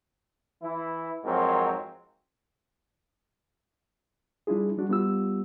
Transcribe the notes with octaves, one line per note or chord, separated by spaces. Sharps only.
E3 E4
F2 G#2 F#3 C4 A#4
G3 D4 E4 F4 G#4
G3 D4 F#4
G3 B3 F4 G4 E6